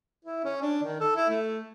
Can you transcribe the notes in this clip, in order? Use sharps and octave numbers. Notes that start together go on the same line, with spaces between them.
E4
C#4
D4
D#3
A4
E4
A3